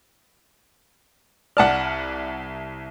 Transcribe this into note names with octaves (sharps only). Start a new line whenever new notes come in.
C2 D5 F#5 A5 F6